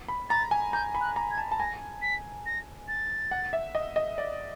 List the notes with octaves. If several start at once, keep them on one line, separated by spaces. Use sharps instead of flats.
B5
A#5 A6
G#5
A#5 G6
B5
F#6
A#5
G#6
A5
A5
G#5 A#6
B6
A#6
A6
F#5
E5
D#5
D#5
D5